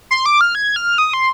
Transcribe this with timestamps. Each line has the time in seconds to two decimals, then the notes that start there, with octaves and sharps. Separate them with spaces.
0.11 C6
0.26 D6
0.41 F6
0.55 G#6
0.76 F6
0.98 D#6
1.13 C6